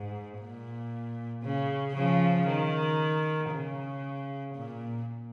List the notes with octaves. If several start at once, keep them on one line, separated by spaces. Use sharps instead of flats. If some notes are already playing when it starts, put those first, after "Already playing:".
Already playing: G#2
A#2
C#3
C#3 F3
D#3
C#3
A#2